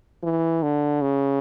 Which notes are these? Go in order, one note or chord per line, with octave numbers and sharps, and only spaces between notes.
E3
D3
C#3